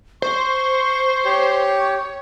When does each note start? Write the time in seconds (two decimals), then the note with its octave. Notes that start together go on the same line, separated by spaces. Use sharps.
0.22 C5 C#6
1.25 G4 C#5